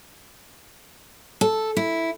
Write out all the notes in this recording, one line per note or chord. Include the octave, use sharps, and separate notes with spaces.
A4
E4